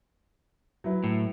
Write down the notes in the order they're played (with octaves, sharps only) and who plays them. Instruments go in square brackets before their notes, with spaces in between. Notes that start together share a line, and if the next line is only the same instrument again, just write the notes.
[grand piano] F#3 E4 B4
[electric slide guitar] A2